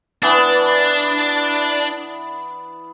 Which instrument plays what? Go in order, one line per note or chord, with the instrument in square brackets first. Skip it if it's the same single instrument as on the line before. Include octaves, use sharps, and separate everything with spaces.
[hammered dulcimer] E3 B3 [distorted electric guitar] D4